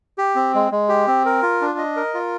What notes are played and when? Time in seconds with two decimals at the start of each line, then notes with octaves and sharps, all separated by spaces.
0.18 G4
0.35 C4
0.54 G#3
0.72 G#3
0.89 G4
1.07 C4
1.25 A#4
1.42 F4
1.61 D4
1.78 D#5
1.96 A#4
2.14 F4